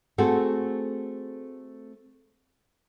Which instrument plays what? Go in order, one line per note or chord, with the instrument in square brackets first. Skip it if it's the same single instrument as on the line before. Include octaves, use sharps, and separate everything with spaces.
[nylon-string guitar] A3 C4 F#4 G#4 A4